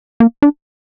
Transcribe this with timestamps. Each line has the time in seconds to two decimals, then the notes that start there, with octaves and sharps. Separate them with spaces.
0.20 A#3
0.42 D4